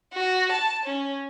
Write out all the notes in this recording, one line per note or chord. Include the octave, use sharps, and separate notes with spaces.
F#4
A5
C#4